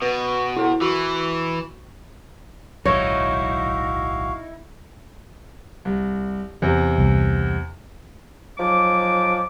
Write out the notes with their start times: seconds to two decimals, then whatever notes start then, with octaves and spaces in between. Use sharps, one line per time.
0.02 B2 B4
0.57 E4 A4 F#5
0.81 E3 F#4 C#6
2.86 D1 B1 G#2 D#4 E4 F#4 C#5 F5
5.85 C2
6.62 E2 C3
6.98 C2
8.58 G#2 F3 F#3 D6